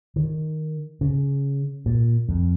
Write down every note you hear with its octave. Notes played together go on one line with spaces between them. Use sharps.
D#3
C#3
A#2
F2